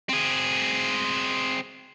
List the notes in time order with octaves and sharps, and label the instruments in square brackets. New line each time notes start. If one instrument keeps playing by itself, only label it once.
[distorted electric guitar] C4 G#4